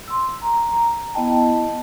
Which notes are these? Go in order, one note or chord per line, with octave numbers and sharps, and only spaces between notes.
C6 E6
A#5
B3 E4 D#5 G5 A5